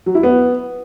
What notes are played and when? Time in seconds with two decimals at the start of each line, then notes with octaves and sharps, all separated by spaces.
0.06 F#3
0.15 E4
0.23 B3